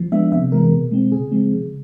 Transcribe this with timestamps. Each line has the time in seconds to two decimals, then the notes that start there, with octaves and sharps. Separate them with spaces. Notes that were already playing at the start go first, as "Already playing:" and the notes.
Already playing: F3
0.12 G#3 B3 D4 E5
0.32 C3 E5
0.52 E3 G#3 B3 A#4
0.72 B2
0.91 G#3 C4
1.12 C#3 G#4
1.31 F3 G#3 C4
1.52 C#3